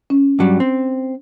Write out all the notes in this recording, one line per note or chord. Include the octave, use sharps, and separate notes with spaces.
C#4
G2 F#3 G3
C4